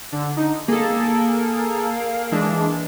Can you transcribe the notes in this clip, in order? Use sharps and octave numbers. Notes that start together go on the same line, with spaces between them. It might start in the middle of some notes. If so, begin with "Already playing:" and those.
D3
D#4
A#3 G#4 A4
E3 G#3 D4